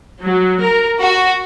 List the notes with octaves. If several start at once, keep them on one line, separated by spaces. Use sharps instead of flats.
F#3
A#4
F#4